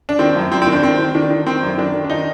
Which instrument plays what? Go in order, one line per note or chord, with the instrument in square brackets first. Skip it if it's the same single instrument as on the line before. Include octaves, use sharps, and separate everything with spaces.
[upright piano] D4
D#3 C4
F#2
F#2 C4
C4
D#3
D4
D#3 C4
D#3
D#3 D4
D#3
D#3 C4
F#2
D#3 D4
D#3
D4
D#3 D#4